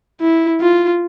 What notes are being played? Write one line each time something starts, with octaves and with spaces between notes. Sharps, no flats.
E4
F4